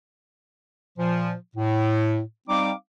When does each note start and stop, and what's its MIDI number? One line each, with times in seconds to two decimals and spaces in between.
0.98 1.33 46
0.98 1.33 53
1.56 2.20 45
2.48 2.71 55
2.48 2.71 60
2.48 2.71 63
2.48 2.71 77
2.48 2.71 86